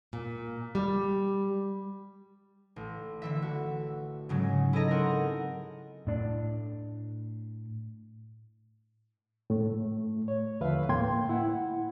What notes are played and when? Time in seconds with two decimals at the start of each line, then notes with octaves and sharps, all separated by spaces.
0.13 A#2
0.75 G3
2.76 A1
3.22 D3 E3 E5
3.42 F#4
4.29 G#2 C#3 F#3 G#3
4.73 E4 G#4 A4 D#5 A#5
4.91 C4 A#4 F#5
6.07 A2 D4
9.50 A2 A3
10.28 C#5
10.60 D#2 D3 F3 B4 E5 F5
10.89 A2 A#3 G5 C6 G#6
11.29 E4 F#5